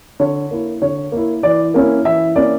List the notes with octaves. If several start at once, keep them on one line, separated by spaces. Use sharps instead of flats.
D3 C#5
A#3 E4
D3 C#5
A#3 E4
E3 D5
A#3 C#4 E4
E3 E5
A#3 C#4 E4 D5